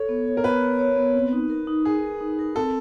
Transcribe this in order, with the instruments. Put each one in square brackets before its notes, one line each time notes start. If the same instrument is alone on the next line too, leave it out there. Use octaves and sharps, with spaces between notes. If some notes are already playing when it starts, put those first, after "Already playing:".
Already playing: [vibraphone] A4 [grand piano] C#5
[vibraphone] B3
C#5
[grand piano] A#4
[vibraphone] B3 [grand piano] B4
[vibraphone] C#5
C#5
B3
C4
D#4
A#4
D#4
[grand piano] G#4 [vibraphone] A#4
[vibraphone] A#4
D#4
A#4
[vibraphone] C4 [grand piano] A4